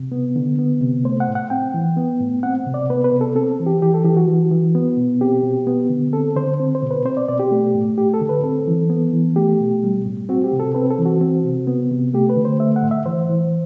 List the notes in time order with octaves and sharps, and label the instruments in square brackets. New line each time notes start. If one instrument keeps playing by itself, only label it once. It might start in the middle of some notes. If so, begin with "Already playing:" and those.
Already playing: [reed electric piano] C3
B3
D3
B3
C3
A3 C5
F#5
A2
F#5
C4 G5
E3
B3
A2
C4 F#5
C3
D5
B3 B4
B4
C3
A4
C4 A4
E3
G4
E3 G4
A4
E3 G4
F#4
E3
E3
B3
B2
C4 G4
B2
B3
D3
C4 A4
D3 C5
C4
C5
B2
B4
C4 C5
D5
B2 D5
G4
A3
A2
A3 G4
A4
D3
B4
C4 A4
E3
B3
E3
A3 G4
B2
G3
A2
C4 F#4
G4
C3
A4
C4 B4
A4
E3
F#4
C4
C3
B3
C3
A3 G4
B4
D3
C5
A3 E5
F#5
A2
E5
E3 C5
E3